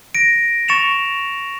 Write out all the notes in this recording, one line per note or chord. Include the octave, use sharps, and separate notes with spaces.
A#6 D7
C#6 A6 C#7 E7 F7